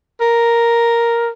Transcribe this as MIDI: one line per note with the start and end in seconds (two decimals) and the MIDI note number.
0.21 1.29 70